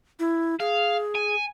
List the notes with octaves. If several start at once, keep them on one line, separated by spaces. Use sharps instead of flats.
E4
G#4 F5
G#5